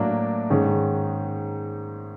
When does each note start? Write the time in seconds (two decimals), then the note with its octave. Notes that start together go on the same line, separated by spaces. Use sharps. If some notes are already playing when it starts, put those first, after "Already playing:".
Already playing: A2 F#3 A#3 D4
0.50 G#2 D#3 G#3 C#4